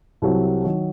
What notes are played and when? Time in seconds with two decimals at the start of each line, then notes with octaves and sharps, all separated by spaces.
0.22 C2 C3 F#3 C4
0.64 D#3 F#3